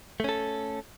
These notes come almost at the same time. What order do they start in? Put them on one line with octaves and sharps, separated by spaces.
A3 C#4 A4